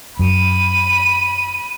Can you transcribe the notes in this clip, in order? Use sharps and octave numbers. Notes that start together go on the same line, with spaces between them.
F#2 B5 D#7